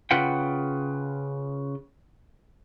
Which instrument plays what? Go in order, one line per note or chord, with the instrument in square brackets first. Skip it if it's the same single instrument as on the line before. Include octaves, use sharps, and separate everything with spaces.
[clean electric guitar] C#3 F4 B4 F#5 G5